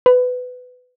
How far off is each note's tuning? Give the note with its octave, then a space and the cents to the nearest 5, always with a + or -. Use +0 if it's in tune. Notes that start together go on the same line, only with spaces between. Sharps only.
B4 +20